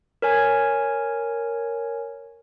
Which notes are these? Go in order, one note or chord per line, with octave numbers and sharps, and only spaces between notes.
A#4 C#5 G#5 G#6